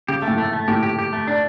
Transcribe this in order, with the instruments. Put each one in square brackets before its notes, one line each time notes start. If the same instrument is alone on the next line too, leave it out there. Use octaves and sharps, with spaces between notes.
[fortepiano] C#3 [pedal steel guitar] G4
[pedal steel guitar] A3
[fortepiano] A2
[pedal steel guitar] A3
A3
[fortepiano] A2 [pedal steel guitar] G4
[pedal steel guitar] G4
G4
A3
D4